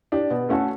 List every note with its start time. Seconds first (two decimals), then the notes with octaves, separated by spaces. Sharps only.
0.12 D4 G4
0.30 B2
0.49 A3 C#4 F#4 A4